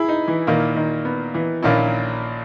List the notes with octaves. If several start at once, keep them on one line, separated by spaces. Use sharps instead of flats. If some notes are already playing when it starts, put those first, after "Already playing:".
Already playing: E4 G#4
D#4
E3
A#2 D#3 A#3 E4
D#3
B3
E3
A#1 A#2 D#3 A#3 C#4 E4